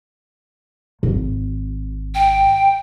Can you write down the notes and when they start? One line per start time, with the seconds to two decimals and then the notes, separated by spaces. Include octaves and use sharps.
1.03 G#1
2.15 G5